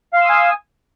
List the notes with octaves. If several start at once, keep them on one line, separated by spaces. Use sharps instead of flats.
F5 G#5 C6 D#6 E6